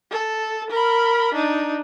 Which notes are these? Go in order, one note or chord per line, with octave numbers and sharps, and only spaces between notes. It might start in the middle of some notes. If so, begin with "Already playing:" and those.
A4
A#4 B5
D4 D#4